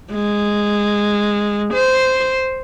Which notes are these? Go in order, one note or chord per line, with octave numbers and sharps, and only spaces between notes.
G#3
C5